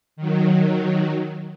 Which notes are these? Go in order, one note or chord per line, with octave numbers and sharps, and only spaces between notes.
D#3 F#3